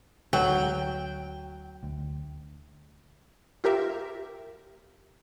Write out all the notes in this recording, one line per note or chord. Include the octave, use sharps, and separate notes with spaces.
D2 F#3 G5
D2
F4 G4 A#4 E5